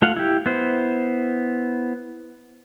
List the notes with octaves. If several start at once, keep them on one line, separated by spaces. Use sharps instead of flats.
A3 F4 F5 F#5
E4 G4
B3 E4 C5